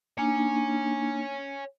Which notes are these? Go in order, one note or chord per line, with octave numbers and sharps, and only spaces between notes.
A#3 D4 D#4 C#5 G#5